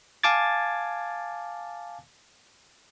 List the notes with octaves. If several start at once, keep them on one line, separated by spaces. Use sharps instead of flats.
F5 G#5 A5 D6 G#6 A6